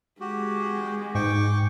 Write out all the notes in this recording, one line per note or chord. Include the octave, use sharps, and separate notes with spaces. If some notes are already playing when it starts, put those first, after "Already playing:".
G#3 F#4 G4
G#2 G5 C#6 D6